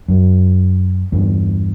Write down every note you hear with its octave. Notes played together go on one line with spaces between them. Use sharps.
F#2
E2 G2